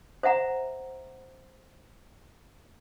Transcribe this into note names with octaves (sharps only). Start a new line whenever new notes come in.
C5 E5 F#5 A#5